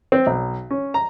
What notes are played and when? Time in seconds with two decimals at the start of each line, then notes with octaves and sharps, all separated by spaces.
0.12 C4
0.27 B1
0.71 C#4
0.94 A#5